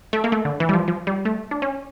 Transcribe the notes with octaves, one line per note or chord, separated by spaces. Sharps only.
A3
A#3
A3
D3
E3
G3
F3
F3
G3
A3
D4
C#4